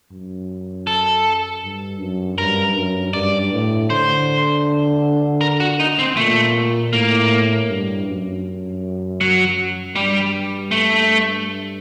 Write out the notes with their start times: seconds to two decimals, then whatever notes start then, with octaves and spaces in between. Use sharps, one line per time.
0.11 F#2
0.87 A4
1.63 G2
2.00 F#2
2.38 G2 A#4
2.76 F#2
3.14 G2 D5
3.53 A2
3.90 D3 C5
5.41 A#4
5.60 F#4
5.80 D#4
5.99 C4
6.17 A#2 A3
6.93 A2 A#3
7.69 G2
8.07 F#2
9.21 F#3
9.96 G2 G3
10.71 A3